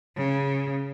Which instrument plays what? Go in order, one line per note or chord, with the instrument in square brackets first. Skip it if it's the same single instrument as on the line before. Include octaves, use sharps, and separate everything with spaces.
[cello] C#3